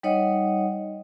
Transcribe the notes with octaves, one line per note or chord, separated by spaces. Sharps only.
G3 D#4 C#5 D#5 F#5